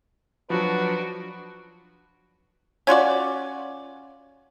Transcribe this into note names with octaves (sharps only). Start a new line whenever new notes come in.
F3 F#3 D4 F#4 B4
C#4 F4 F#4 D5